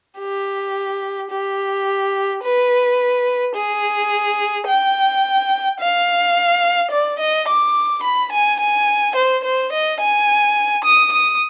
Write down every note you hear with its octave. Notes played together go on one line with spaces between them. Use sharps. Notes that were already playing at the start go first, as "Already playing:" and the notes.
G4
G4
B4
G#4
G5
F5
D5
D#5
D6
B5
G#5
G#5
C5
C5
D#5
G#5
D#6
D#6